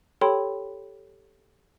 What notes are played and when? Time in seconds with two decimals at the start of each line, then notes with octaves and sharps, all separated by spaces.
0.21 G4 A4 C#5 G5 B5 C6